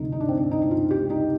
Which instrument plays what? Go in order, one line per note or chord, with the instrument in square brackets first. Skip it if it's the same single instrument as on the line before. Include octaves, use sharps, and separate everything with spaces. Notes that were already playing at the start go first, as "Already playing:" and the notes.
Already playing: [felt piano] D2 C3 F3 D#4
D#4
D4
C4
D4
D#4
D#4
F4
G4
D#4